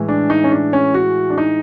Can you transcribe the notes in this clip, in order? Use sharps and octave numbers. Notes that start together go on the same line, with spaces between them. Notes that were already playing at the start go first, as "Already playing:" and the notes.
Already playing: A2 E3 G#3
D4
D#4
C#4
D4
C#4
F#4
D4
D#4